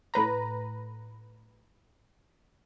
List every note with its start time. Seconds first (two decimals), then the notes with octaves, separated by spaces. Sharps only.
0.14 A2 B4 A#5